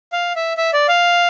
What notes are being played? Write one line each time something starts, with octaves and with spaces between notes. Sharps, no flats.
F5
E5
E5
D5
F5